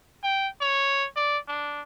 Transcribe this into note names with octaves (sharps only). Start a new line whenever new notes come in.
G5
C#5
D5
D4